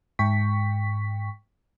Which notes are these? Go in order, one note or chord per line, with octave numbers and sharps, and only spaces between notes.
G#2 G5 C#6 B6